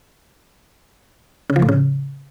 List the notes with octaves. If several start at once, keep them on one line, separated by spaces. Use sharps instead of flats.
C#3
F3
A2
C#3